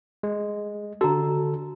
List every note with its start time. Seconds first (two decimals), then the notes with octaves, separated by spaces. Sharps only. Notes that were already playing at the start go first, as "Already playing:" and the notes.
0.23 G#3
1.01 D3 F#4 A4 A#5